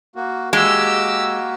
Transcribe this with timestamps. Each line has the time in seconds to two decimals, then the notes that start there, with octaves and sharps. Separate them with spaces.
0.16 A#3 F#4
0.53 G#3 A#3 F#4 G4 E6